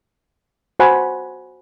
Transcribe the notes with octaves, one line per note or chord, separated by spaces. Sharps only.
F#4 C5 F#5 G#5 B5